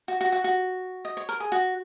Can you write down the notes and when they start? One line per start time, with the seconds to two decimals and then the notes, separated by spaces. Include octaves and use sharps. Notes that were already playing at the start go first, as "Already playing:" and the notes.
0.08 F#4
0.21 F#4
0.32 F#4
0.44 F#4
1.05 D#5
1.17 C#5
1.29 A#4
1.40 G#4
1.52 F#4